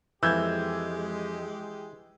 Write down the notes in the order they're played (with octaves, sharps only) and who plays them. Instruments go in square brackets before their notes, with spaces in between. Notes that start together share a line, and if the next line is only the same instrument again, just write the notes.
[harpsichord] F2 [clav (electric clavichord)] E3 [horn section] G#3 G4 [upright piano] E6 G6 G#6